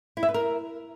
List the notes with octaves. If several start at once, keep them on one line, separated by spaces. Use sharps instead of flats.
E4
E5
B4
A#4